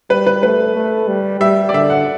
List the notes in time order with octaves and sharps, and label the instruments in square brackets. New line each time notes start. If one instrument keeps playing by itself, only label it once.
[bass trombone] G3 [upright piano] B4
[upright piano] B4
[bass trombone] A3 [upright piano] B4
[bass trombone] A3
G3
[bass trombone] G3 [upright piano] E5
[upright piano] D5
[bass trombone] D3 [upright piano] E5
[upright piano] F#5